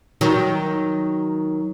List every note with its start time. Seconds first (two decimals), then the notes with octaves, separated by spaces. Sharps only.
0.21 D#3 F#3